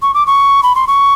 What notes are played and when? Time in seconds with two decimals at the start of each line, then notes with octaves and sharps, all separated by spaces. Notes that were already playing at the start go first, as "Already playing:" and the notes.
0.02 C#6
0.14 D6
0.27 C#6
0.63 B5
0.75 C6
0.88 C#6